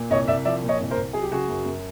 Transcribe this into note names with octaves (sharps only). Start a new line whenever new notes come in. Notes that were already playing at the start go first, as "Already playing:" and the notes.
Already playing: A#2
C2 C#5 D#5
C2 D5 E5
F3 D5 E5
A#2
C#5 D#5
C2
A#4 C5
C2
F#3 G#4
G4
C#3 F#4 G#4
F#2
F#2